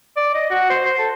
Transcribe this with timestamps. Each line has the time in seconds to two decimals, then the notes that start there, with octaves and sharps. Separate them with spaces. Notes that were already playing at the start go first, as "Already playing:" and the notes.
0.17 D5
0.34 D#5
0.50 F#4
0.70 C5
0.85 C5
0.98 A4